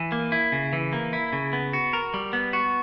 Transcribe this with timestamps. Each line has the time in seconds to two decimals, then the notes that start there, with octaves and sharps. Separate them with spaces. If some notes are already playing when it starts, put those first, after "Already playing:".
Already playing: E3
0.12 A#3
0.32 E4
0.52 C#3
0.73 E3
0.93 A#3
1.13 E4
1.33 C#3
1.53 B3
1.73 F#4
1.93 A#4
2.14 G3
2.33 B3
2.53 F#4